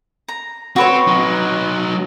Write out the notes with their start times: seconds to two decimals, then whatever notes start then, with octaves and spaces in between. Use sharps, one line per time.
0.28 A#5
0.76 C4 F#4 B4 C#5
1.07 F#3 D#4